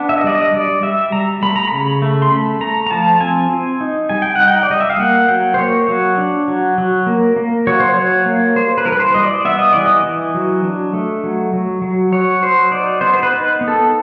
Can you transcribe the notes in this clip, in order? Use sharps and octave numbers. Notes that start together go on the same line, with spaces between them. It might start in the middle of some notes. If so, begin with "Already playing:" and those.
Already playing: B3 D4
E5
D#5
G3 D5
D#5
G3 D5
G3 E5
G3 A#5
A3 B5
A#5
C#3 B5
A3
C6
A3 B5
A3 A#5
A#5
F3 A5
C4 G#5
C4
D#4
G3 G#5
G5
D#4 F#5
G5
D5
G3 D#5
E5
F5
A#3 F#5
F#3 G5
C5
A#3 C#5
F#3
D4
F#3
F#3
A#3
A#3
F#3 C#5
C5
F#3 C#5
A#3
G3 C5
B4
E3 A#4
B4
C5
G3 D#5
D5
B3 E5
D#5
E3 D5
D#5
E3
F#3
D4
A3
F#3
F#3
F#3
F#3 C#5
F#3 C5
D#4 D5
B3 C5
C5
B4
D#4
B3
A4